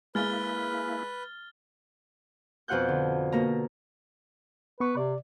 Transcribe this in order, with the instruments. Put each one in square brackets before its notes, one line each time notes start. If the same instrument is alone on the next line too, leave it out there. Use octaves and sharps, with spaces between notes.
[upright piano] G#3 [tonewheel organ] A#3 E4 [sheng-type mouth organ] B4 [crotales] F6 A6 G7
[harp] F2 B2 F4 F#5 F#6 G6
D3
B2 A#3 A#5
[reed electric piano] B3 C#6 [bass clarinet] B4
[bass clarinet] C3 [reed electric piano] D5